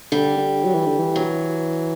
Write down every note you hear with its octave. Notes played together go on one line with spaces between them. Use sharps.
D3 G3
D3
F#3
E3
D3
E3
F#3